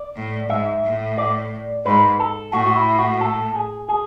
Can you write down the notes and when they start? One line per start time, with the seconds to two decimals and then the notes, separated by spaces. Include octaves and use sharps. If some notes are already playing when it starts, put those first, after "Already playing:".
Already playing: D5
0.16 A2
0.49 G#2 E5
0.84 A2
1.18 D5
1.85 G#2 B4
2.20 A4
2.53 A2 F#4
2.66 F#4
2.76 E4
2.99 F#4
3.21 A4
3.55 G#4
3.89 G#4